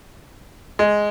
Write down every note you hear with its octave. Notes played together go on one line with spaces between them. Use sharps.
G#3